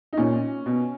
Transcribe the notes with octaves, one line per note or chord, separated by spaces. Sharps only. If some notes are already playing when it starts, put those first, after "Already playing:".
D#4
A#2 C#4
B2